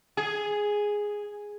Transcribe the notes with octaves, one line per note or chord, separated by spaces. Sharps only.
G#4